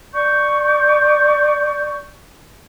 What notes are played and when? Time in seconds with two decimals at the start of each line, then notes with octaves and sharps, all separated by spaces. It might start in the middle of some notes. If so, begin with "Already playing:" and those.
0.13 D5 C#6 G6